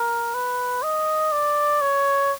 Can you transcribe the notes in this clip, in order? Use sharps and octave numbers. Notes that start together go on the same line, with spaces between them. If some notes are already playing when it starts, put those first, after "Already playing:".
Already playing: A#4
B4
D#5
D5
C#5